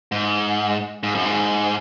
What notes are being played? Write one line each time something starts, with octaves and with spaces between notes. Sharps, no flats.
G#2
G#2
F#2
G#2